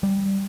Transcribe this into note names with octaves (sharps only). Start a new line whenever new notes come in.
G3